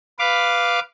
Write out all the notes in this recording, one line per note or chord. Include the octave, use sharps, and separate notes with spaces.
B4 F5 D6